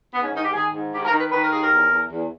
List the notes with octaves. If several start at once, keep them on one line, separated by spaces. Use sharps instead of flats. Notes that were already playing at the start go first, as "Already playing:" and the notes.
G#2 B3
C#4
D#3 D#4
G4
D#3 G#4
G#2
D#3 G4
A#4
D#3
B4
D#3 B4
A#4
D#2 G#4
A#4
E2
E2
E2